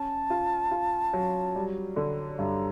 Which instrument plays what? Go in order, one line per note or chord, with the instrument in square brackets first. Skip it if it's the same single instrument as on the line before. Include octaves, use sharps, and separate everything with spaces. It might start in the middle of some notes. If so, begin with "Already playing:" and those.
Already playing: [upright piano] C#4 [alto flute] A5
[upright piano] F4
F4
F#3
G3
D3
[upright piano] G2 [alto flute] A#5